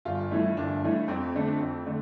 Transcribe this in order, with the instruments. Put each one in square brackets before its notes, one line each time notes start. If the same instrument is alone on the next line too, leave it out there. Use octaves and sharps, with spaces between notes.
[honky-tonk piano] G1 [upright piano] F4
[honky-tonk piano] G2 E3 A3 [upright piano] E4
[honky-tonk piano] G1 [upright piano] D4
[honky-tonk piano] G2 E3 A3
[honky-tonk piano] F2 [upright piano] C4
[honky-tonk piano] D3 A3 D4 A4
F2
D3 A3